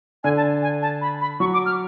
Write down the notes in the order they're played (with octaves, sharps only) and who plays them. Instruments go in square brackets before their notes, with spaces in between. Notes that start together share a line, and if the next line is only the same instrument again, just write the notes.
[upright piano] D3 [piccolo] G#5
[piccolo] A5
G#5
A5
B5
B5
[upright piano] F#3 [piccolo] C#6
[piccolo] D6
F6